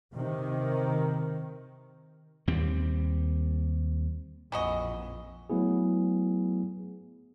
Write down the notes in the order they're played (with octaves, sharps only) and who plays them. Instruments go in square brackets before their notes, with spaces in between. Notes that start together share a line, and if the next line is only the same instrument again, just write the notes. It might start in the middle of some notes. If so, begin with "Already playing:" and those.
[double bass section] C3 D#3
[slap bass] D#2 G3 C4
[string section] A#1 F2 [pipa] E3 F#4 D#5
[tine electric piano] F#3 A3 B3 E4 G#4